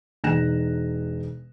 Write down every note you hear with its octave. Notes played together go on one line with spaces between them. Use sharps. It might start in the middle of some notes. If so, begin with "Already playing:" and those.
E1 D#4 F#6 A#6 E7